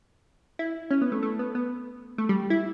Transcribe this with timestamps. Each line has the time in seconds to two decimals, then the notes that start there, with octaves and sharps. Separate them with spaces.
0.59 E4
0.91 C#4
1.02 B3
1.12 A3
1.23 A3
1.39 B3
1.55 B3
2.18 A3
2.29 G3
2.50 E4